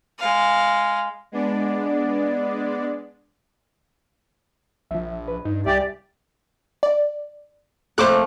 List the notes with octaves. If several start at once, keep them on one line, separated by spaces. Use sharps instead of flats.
G#3 F5
G#3 B3 D4 D5
A#1 F3 E5
B4
G2 D#4
C2 G4 D5 E5 G#5 D6
D5
F2 A3 A#3 C5 D6 F#6